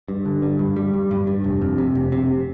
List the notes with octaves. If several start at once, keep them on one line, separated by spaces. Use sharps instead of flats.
G2
D3
G2
G2
G3
G2
G2
G2
F1
F2
C3
F1
C3